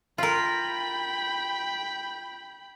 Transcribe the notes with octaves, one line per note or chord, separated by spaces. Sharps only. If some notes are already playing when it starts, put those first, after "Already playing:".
F4 A#4 G5 B5